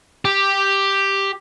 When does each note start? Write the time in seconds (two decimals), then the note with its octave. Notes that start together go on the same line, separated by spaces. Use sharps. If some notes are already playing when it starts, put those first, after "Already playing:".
0.25 G4